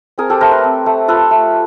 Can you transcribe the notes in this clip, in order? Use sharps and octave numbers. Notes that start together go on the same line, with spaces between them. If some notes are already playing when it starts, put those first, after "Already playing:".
C4 G#4 A#4
G4 A4
A3 A#4 C5
A4 B4
C4
A3
F4 A4 B4
A3